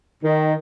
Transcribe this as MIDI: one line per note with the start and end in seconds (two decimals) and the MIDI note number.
0.23 0.53 51